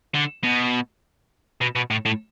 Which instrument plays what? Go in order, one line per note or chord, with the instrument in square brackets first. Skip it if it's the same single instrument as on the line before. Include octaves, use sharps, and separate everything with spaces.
[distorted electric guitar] D3
B2
B2
B2
A2
A2